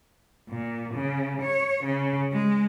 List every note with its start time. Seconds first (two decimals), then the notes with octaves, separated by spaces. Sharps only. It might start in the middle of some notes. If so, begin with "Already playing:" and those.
0.48 A#2
0.94 C#3
1.41 C#5
1.84 C#3
2.32 G#3